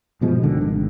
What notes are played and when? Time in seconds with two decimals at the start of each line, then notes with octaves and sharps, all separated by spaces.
0.21 G2 B2 F3 G#3
0.43 C#2 D3 D#3
0.61 G#1